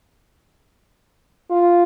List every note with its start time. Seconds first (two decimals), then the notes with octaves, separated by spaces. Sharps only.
1.50 F4